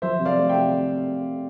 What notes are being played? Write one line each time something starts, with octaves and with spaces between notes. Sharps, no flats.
F3 C5 E5
C3
D5 F5
A3
E5 G5
C3